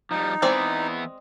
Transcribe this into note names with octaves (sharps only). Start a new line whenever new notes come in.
F3 G3 D#4
E3 G#3 B3 C4 E4 D5